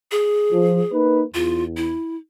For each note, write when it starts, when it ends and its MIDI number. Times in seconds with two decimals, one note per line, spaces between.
0.11 0.92 68
0.52 0.81 53
0.92 1.24 58
0.92 1.24 63
0.92 1.24 71
1.34 1.93 40
1.34 1.63 65
1.77 2.16 64